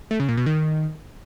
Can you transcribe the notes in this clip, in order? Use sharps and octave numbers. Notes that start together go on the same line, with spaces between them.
A3
C#3
A#2
B2
D#3